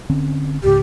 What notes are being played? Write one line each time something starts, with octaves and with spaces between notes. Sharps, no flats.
D3 C4 C#4
C#2 G#2 C#3 G4